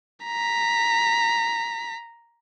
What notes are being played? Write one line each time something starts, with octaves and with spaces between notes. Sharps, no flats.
A#5 B6